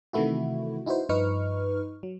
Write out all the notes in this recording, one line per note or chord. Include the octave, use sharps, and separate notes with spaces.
C3 D#3 E3 A3 E4 F#4
D#4 E4 F#4 B4 C5
G2 F3 D#4 B4 C#6 F6
F#3